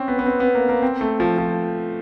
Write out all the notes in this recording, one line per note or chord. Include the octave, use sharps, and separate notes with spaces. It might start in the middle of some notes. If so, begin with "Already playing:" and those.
Already playing: C4 C#4
B3
B3
C4
B3
A#3
A#3
C4
A3
F3
F3